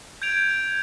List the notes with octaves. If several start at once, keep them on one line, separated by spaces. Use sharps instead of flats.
G6 G#6 D7 F7